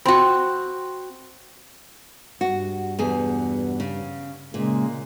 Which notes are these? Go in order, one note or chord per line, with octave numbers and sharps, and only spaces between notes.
C4 F#4 B5 C6
G2 F#4
E2 B2 G#4
C#3
A#2 C#3 G#3 A#3